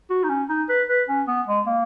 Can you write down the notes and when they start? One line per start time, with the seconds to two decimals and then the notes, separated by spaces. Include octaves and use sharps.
0.10 F#4
0.24 D#4
0.30 C#4
0.49 D#4
0.69 B4
0.89 B4
1.09 C#4
1.28 B3
1.47 G#3
1.67 A#3